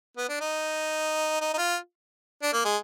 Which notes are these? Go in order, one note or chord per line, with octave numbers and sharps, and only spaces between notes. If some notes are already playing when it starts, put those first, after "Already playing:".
B3
D4
D#4
D#4
D#4
F4
D4
A#3
G#3